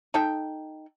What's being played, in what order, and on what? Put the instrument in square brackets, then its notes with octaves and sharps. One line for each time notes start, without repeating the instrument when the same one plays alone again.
[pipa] D#4 A4 G5